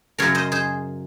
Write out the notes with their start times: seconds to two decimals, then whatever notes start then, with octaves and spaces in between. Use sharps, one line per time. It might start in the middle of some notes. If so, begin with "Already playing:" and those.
0.18 F#2 C#3 F#3 A#4 C#5
0.35 C5 D#5
0.52 G#4 C5